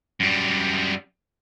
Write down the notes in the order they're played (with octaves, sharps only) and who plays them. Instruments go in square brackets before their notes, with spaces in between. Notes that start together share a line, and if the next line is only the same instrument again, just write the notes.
[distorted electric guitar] F#2 G3